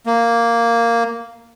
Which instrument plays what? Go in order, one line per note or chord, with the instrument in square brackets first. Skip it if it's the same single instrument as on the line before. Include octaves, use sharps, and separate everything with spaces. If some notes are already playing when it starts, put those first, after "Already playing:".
[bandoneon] A#3